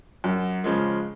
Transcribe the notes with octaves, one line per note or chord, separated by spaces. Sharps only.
F#2
C#3 F3 G#3